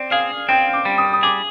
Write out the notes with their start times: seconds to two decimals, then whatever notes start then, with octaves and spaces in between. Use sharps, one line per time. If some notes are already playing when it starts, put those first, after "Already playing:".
Already playing: C4 D5
0.11 G#4 F5
0.49 C4 G5
0.73 D6
0.85 G3
0.98 D#6
1.13 D#6
1.23 G#4 D6